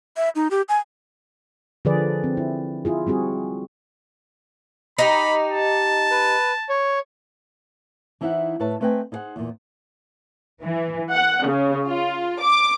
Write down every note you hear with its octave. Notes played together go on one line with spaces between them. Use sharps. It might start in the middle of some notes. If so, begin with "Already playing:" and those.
E5
D#4
G4
G#5
D3 F3 G#4 B4 D5
C4
E4
E4 F4 G#4
G3 C4 F#4 G#4
D#4 G4 B5
A5
B4
C#5
E3 D#4 E4 C5 E5 F#5
A2 B4 C#5 E5 A5
A3 C4 B4 D#5 G5 G#5
D#4 E4 G#4 C5 F#5
E2 A#2
E3
F#5
C#3
F4
D6